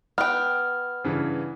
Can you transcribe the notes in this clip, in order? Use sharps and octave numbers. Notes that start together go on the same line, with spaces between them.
B3 G5 F6
G2 C#3 E3